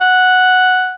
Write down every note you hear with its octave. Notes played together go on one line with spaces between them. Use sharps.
F#5